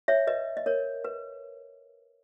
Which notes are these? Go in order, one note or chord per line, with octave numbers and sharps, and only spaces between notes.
C#5 E5
B4 D#5
D#5
A#4 C#5
B4